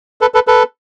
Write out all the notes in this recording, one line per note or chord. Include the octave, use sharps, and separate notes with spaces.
A4 B4
A4 B4
A4 B4